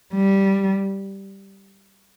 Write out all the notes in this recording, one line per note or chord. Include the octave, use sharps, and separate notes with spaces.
G3